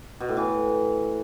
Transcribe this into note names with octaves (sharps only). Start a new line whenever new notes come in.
B2
A2
E3